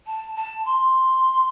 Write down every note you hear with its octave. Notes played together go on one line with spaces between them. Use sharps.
A5
A5
C6